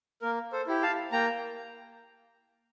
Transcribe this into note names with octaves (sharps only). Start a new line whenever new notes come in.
A#3 A#4
A4 C5
E4 G4
F5 A5
A#3 G5 A#5